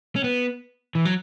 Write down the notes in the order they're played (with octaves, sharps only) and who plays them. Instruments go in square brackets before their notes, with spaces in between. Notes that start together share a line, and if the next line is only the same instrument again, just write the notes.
[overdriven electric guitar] C#4
B3
E3
F#3